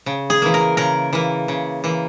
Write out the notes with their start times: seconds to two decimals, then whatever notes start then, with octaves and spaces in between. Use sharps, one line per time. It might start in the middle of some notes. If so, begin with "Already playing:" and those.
0.06 C#3
0.30 G#4
0.42 E3 A#3
0.54 A#4
0.77 C#3 A#4
1.13 E3 A#3
1.48 C#3
1.84 E3 A#3